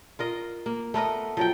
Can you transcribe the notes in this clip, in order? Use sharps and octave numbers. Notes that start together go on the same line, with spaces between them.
F4 A#4 D#5
A#3
A3 B3 A#4 D#5
F3 F#3 G5